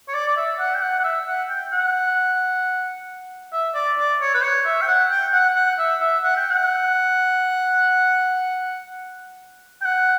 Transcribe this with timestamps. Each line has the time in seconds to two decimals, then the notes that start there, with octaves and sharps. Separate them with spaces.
0.08 C#5
0.14 D5
0.27 D5
0.36 E5
0.59 F#5
0.74 G5
0.81 F#5
0.99 F#5
1.04 E5
1.27 F#5
1.49 G5
1.72 F#5
3.52 E5
3.75 D5
3.98 D5
4.21 C#5
4.34 B4
4.43 C#5
4.65 E5
4.81 G5
4.87 F#5
5.10 G5
5.33 F#5
5.56 F#5
5.78 E5
6.01 E5
6.24 F#5
6.37 G5
6.49 F#5
9.81 G5
9.85 F#5